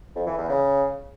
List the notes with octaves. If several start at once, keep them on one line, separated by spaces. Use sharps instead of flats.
F2
E3
E2
C#3